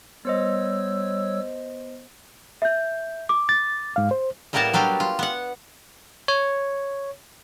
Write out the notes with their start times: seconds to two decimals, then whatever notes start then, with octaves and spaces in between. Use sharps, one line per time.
0.25 G3 B3 C5 C#5 D#5 E6
2.62 E5 G6
3.29 D6
3.49 A6
3.96 G#2 F5
4.11 C5
4.53 A2 G3 A#3 B3 A#4 A5
4.73 F#3 G3 D4 G4 F5
5.00 F4
5.19 B3 F#5
6.28 C#5